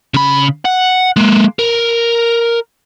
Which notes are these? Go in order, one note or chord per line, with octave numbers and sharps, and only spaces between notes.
C#3 B5
F#5
G#3 A#3
A#4